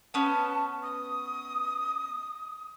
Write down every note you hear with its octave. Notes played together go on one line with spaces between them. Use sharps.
B3 C#4 A5
D#6